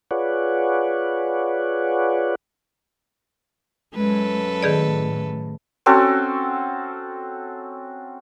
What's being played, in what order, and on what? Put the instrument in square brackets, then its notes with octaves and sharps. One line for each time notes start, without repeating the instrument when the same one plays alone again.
[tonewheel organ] F4 G#4 B4 C#5 D5 F#5
[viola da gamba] F#2 A4 B4 [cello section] G#3
[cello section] A2 [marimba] D#3 G#4 D5
[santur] C4 C#4 F#4 A4